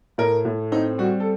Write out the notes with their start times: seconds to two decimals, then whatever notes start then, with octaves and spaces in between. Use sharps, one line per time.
0.18 A2 A#4
0.45 A2
0.72 C4 D#4
0.98 G3 F#4
1.20 A4